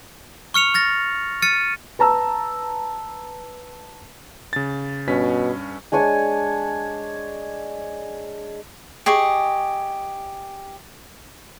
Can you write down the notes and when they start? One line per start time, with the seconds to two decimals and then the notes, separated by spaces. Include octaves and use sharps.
0.54 C#6 F6 C#7 F7
0.74 F6 A6 A#6
1.42 F6 A6 C#7 D#7
1.99 B4 A5 A#5 E6
4.53 C#3 A6
5.08 G2 B2 C#4 B6
5.92 G#3 D4 C#5 G#5
9.06 G4 G#4 D#5 C#6